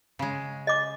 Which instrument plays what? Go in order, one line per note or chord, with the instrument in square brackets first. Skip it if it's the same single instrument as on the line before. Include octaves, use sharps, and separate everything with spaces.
[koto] C#3 G#3
[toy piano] D#5 D6